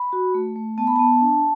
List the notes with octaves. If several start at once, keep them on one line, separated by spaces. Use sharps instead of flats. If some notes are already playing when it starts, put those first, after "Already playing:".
Already playing: B5
F#4
A3
A3
B3 A5
B5
B3 A5
D4